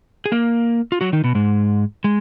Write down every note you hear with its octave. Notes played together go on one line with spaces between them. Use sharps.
G#4
A#3 A#4
F4
F#3 F#4
D#3 D#4
B2 B3
G#2 G#3
G#3